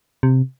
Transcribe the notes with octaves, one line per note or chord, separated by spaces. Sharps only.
C3